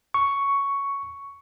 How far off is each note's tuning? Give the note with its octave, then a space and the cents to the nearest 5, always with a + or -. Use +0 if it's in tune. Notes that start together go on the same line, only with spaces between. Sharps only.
C#6 +5